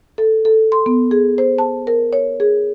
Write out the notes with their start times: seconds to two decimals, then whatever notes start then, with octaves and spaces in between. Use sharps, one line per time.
0.18 A4
0.45 A4
0.72 C6
0.86 B3
1.11 G#4
1.38 C5
1.58 A5
1.87 A#4
2.13 C#5
2.40 G#4